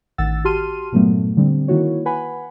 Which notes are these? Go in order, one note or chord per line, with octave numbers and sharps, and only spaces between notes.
A1 D#3 F#5 E6 A6
F#4 G4 A5 C6 F6 D#7
G2 A#2 F#3 A3 B3
D3 G3 C4
D#3 A#3 E4 F#4 C#5
B4 F#5 G#5 B5